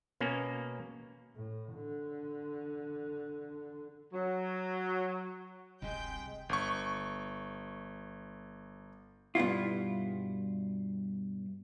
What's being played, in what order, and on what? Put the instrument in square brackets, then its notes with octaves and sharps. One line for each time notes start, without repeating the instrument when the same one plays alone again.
[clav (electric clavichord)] B2 A#3 C#4
[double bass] A2
D3
[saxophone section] F#3
[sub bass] E1 [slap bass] C2 G2 C3 [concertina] G#3 [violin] G5 G6
[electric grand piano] G1 C#6
[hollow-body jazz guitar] G2 B2 E4 F4